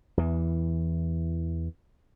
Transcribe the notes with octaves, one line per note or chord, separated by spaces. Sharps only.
E2 E3